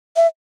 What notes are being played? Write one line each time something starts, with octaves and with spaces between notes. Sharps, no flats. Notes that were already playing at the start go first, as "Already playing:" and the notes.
E5